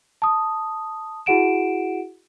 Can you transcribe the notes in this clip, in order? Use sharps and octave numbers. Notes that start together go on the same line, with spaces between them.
A5 D#6
E4 F#4 G#4 F#5 D7 E7